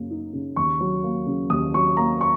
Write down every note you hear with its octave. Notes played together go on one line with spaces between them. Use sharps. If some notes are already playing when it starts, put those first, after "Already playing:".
Already playing: F#2 C#3 A#3
D#4
C#3
D#2 C#6
F#3
A#3
C#3
D#2 D#6
F#3 C#6
A#3 A#5
C#6